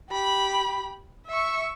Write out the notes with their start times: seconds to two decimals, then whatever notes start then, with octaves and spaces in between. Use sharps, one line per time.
0.10 G4 B5
1.27 E5 C#6